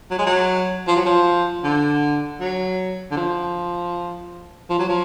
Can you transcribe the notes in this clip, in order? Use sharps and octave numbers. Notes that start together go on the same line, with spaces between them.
F#3
G#3
F#3
F3
F#3
F3
D3
F#3
D3
F3
F3
F#3
F3